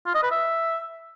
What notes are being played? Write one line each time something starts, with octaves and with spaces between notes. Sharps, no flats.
F4
D#5
B4
E5